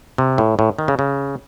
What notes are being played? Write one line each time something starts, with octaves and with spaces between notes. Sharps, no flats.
C3
A2
A2
D#3
C#3
C#3